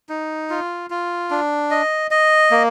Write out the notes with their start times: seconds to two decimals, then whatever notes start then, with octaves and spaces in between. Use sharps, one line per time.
0.09 D#4
0.50 F4
0.90 F4
1.30 D4
1.71 D#5
2.11 D#5
2.51 A#3